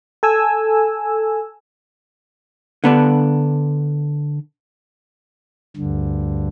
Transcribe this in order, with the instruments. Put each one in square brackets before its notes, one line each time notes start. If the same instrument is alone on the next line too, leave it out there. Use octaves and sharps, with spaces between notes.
[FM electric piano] A4 G#5 E6
[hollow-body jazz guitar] D3 B3 D4
[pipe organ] D2 G2 D3